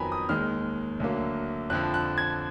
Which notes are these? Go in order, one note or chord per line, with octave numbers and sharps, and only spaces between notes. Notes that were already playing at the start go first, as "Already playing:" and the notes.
Already playing: F2 D#3 F#3 B3 G#5 A#5 B5
D#6
D#2 D#3 G#3 F6
D2 D3 F#3 A#3
F2 D3 F3 F#6
F#6
G#6